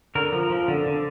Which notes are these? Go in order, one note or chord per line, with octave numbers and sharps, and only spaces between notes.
D3 A#4
F3
F3
D3
D3